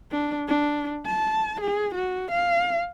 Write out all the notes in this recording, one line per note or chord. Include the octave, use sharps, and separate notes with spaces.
D4
D4
A5
G#4
F#4
F5